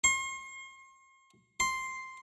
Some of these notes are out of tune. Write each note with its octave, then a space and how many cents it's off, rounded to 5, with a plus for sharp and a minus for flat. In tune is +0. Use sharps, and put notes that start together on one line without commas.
C6 +40
C6 +0